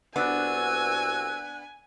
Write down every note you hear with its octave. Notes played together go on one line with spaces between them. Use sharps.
C2 B3 D4 F#4 G#5 E6 F#6